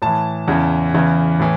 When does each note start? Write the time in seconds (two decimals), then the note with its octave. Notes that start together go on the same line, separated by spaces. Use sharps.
0.02 A2 E3 A5
0.48 E2 C#3 E3
0.94 E2 C#3 E3
1.40 A2 E3